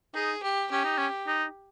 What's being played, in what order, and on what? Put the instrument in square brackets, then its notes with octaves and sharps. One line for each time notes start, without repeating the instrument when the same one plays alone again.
[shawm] D#4 [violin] G#4
[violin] G4
[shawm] C#4 [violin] G4
[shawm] D#4
C#4
D#4